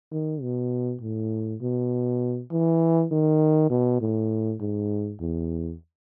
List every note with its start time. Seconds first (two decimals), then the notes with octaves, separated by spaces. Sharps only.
0.12 D#3
0.42 B2
1.01 A2
1.61 B2
2.51 E3
3.11 D#3
3.70 B2
4.01 A2
4.61 G#2
5.20 E2